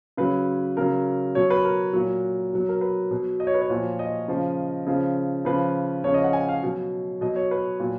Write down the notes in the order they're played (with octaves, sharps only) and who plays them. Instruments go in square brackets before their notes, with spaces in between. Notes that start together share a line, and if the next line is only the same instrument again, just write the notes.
[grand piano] C#3 F#3 B4
C#3 F#3 A#4
B2 F#3 C#5
B4
A#4
A#2 F#3
B2 F#3
A#4
B4
B2 F#3
D#5
C#5
B4
C#5
A#2 F3
D#5
C#3 F3
C#3 F3
C#3 F3 B4
C#3 F3 C#5
D#5
F#5
G#5
F5
B2 F#3
B2 F#3 D#5
C#5
B4
A#2 F#3